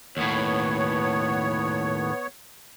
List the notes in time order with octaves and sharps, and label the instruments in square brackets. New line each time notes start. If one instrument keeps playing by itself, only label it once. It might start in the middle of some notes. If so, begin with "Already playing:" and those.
[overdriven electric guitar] D#2 A2 [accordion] B3 C#5